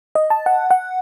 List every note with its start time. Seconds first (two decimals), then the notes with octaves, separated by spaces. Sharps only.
0.15 D#5
0.30 A5
0.46 F#5
0.71 F#5